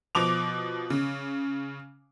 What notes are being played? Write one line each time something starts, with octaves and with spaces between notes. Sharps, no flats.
B2 F3 D6 F7
C#3